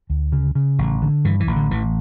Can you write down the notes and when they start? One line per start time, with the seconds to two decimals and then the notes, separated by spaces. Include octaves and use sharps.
0.10 D2
0.32 C#3
0.55 C#3
0.78 A1
1.02 D3
1.24 G2 E3
1.40 E3
1.47 A1
1.56 D3
1.71 A1 E3